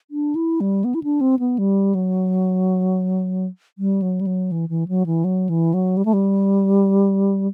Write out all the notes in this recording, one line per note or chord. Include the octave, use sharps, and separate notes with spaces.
D4
E4
G3
B3
E4
D4
C4
B3
G3
F#3
G3
F#3
G3
F#3
E3
E3
F#3
E3
F#3
E3
F#3
G3
A3
G3